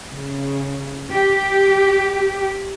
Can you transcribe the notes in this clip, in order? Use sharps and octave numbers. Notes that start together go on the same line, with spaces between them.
C#3
G4